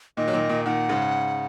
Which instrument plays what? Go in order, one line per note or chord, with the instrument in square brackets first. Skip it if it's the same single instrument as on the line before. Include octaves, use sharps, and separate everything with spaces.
[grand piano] A#2 D#3 [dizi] D#5
[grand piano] F#3
A#2 D#3
A#2 D#3
[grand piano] A#2 D#3 [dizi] F#5
[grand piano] G#2 C#3